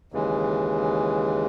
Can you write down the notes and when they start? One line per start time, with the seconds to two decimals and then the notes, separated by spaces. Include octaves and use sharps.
0.12 D#2 C#3 E3 G#3